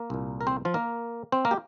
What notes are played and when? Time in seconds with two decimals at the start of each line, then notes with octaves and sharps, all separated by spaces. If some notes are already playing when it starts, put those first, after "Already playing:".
Already playing: A#3 A#4
0.10 C2 A#2
0.41 A#4
0.47 C4 C5
0.65 F3 F4
0.74 A#3 A#4
1.32 C4 C5
1.45 A#3 A#4
1.51 G4